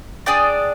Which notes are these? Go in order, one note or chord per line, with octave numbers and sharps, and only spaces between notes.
D4 G#4 D5 G5